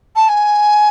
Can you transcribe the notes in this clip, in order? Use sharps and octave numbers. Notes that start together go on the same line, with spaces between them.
A5
G#5